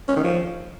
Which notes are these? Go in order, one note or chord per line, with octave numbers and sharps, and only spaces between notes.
C#4
D#3
F3